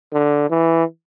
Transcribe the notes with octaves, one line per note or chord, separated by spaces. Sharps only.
D3
E3